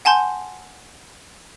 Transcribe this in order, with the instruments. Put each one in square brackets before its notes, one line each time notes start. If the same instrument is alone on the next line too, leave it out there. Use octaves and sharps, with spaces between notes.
[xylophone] F#5 G#5 A5 C6 G6